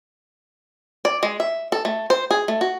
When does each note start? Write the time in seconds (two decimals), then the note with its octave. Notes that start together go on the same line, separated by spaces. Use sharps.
1.05 D5
1.23 G#3
1.40 E5
1.72 A4
1.85 A3
2.10 C5
2.31 G#4
2.48 A3
2.61 F#4